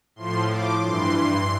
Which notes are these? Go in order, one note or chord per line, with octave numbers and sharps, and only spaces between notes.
A2 F3 C6
D6
G2 E3 C6